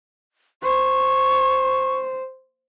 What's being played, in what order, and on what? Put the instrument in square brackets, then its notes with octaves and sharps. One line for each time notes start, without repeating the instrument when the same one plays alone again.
[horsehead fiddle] C5 [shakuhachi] C#6